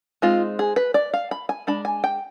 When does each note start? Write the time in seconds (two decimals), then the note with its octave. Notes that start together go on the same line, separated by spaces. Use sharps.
0.22 G#3 C4 D#4 F4
0.59 G#4
0.76 B4
0.94 D5
1.14 F5
1.31 B5
1.49 G#5
1.67 G#3 D4 B5
1.85 G#5
2.04 G5